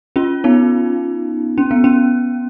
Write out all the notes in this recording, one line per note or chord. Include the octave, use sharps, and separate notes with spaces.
C#4 F4
B3 D#4
C#4
B3
C#4